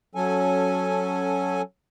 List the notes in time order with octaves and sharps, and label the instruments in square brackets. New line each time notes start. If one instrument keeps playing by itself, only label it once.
[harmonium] F#3 C#4 A4 G#5